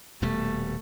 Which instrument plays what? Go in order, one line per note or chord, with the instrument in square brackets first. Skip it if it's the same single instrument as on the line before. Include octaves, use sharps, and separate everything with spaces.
[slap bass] D#1 B2 G3 [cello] A3